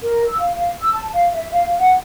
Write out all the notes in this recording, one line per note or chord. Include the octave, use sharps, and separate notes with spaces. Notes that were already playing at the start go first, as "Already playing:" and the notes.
A#4
E6
F5
F5
E6
A5
F5
E5
F5
F#5